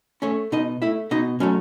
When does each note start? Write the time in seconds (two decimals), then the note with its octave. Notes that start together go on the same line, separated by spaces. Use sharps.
0.22 A3 C#4 C#5
0.52 B2 D#4 D#5
0.82 A3 E4 E5
1.11 B2 D#4 D#5
1.40 F#3 A3 C#4 C#5